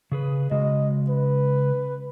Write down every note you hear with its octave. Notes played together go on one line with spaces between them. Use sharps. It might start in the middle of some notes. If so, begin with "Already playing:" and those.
C#3 G#4 B4
C#3 G#3 F#4 D#5
B4